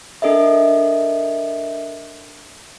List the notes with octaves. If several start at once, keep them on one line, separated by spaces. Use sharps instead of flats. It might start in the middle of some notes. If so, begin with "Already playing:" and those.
D4 A4 A#4 D#5 E5